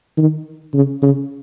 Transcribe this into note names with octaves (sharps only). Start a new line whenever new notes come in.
D#3
C#3
C#3